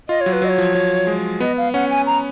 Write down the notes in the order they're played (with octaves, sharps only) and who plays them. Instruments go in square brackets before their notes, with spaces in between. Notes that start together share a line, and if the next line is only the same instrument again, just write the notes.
[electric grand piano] F4 [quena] D#5
[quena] C#5
[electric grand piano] F#3
[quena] B4
[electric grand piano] F#3 [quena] D#5
[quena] C#5
[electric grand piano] F3
F#3
G#3
[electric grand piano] B3 [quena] D#5
[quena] F5
[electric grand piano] C#4 [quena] F#5
[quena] G#5
A#5